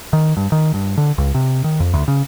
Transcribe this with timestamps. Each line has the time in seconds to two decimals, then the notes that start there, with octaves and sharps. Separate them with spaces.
0.13 D#3
0.37 G2
0.52 D#3
0.74 G2
0.98 D3
1.18 C#2
1.34 C3
1.64 D#3
1.80 F2
1.94 D2
2.08 C#3